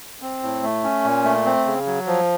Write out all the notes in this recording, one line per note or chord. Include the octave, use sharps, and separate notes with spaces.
C4
A2
A3
C#4
A#2
A3
C4
C#3
F#3
F3